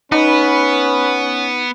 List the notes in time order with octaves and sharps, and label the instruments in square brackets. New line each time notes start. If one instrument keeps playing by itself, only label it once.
[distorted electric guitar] B3 [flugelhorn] C#4 [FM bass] D#4 [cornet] B4